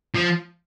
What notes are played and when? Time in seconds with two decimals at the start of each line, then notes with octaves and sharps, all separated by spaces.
0.15 F3